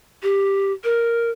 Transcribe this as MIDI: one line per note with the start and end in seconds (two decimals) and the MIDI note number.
0.23 0.72 67
0.84 1.30 70